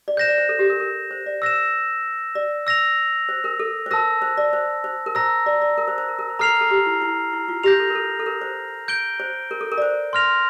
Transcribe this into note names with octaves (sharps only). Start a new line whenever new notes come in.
D5
C5 G6 A#6 E7
D5
C5
A4
G4
A#4
A#4
C5
D5
C5 E6 A#6 E7
D5
E6 A#6 F7
C5
A#4
A4
C5
A#4 A5 E6 A#6
C5
D5
C5
C5
A#4
C5 A#5 E6 A#6
D5
D5
A#4
C5
C5
A#4
A#4
C5
A4 A#5 F6 C7 F7
A4
G4
E4
E4
E4
F4
G4 G6 A#6 F7
A4
A#4
A4
A4
A#4
C5
G6 D7 G7
C5
A#4
A4
A#4
D5
C5
C6 F6 A#6 F7